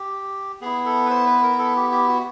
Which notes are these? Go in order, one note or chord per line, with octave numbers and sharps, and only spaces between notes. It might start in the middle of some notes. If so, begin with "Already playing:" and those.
Already playing: G4
B3 E4 G#4
A4
B4
C5
B4
A#4
A4
G4
G4
F#4